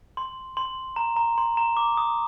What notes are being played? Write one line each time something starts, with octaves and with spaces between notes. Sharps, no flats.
C6
C6
A#5
A#5
C6
A#5
D6
D#6